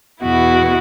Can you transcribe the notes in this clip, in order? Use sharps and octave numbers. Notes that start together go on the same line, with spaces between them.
E2 B2 B3 E4 F#4